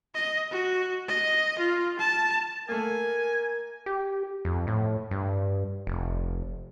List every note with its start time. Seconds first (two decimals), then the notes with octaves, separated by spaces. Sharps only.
0.15 D#5
0.51 F#4
1.08 D#5
1.59 F4
1.99 A5
2.69 A3 A#3 A#4 G#5
3.86 G4
4.45 F2
4.67 A2
5.11 G2
5.87 F1